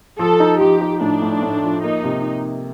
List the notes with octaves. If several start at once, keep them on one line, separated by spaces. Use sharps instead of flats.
F3 A4
D#4
F3 G4
D#4
A2 D4
A2
A2
F3
A#3 D#4
C3